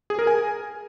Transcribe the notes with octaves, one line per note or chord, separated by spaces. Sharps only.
G#4
A#4
G#5